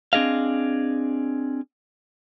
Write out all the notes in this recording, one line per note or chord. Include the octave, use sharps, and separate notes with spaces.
C4 D4 G#4 D#5 F5